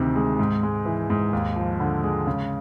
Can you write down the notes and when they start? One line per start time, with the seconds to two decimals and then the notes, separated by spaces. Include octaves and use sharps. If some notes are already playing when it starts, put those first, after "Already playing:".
Already playing: D2 C3 D#3
0.16 G#3
0.39 G#2
0.63 G#3
0.85 E3
1.10 G#2
1.33 D#2
1.56 F3
1.80 D3
2.04 G#3
2.27 C#3